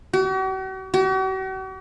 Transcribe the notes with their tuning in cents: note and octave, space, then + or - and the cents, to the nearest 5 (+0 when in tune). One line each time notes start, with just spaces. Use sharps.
F#4 +45
F#4 +45